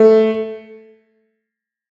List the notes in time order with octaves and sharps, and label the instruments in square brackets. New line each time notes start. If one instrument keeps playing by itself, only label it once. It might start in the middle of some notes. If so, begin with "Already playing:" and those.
Already playing: [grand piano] A3